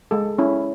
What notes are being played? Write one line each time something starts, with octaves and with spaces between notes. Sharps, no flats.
G#3 A4
C#4 E4